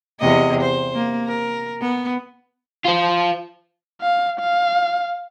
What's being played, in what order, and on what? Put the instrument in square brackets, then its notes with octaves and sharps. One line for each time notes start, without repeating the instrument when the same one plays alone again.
[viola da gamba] E2 C3 D#5
C5
A#3
A#4
B3
[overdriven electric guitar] F4 C5
[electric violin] F5
F5